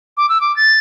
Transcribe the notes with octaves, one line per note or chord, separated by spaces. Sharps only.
D6
E6
D6
A6